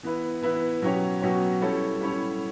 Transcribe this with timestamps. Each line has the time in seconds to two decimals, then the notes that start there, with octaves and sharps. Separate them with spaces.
0.03 E3 B3 E4 B4
0.42 E3 B3 E4 B4
0.82 B2 F#3 C#4 G4 C#5
1.22 B2 F#3 C#4 G4 C#5
1.62 G3 C#4 E4 A4 C#5
2.00 G3 C#4 E4 A4 C#5